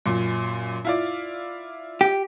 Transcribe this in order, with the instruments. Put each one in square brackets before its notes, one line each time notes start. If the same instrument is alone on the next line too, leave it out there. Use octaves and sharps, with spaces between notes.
[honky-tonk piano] F#2 A#2
E4 F4 D5
[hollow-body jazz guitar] G4